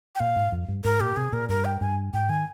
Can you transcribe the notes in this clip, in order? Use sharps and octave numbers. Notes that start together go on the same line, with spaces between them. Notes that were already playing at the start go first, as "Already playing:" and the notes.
G5
A#2 F5
G#2
F2
G2
G#2 A#4
A#2 G4
C3 G#4
A#2 A#4
G2 A#4
G5
G2 G#5
G#2 G5
D#3 G#5